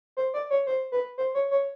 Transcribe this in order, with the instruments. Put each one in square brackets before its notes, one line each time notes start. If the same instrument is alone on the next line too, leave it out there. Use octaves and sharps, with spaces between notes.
[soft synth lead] C5
D5
C#5
C5
B4
C5
C#5
C#5